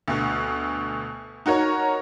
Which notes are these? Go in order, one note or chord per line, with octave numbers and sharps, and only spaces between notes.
D2 B2
D#4 F#4 A#4 C#5